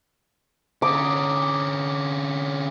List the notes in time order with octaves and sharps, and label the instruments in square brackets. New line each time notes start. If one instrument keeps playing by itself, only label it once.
[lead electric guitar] D3 C#4 [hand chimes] A#5 D#6 [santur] D6